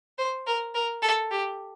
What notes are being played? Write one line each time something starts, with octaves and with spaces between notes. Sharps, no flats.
C5
A#4
A#4
A4
G4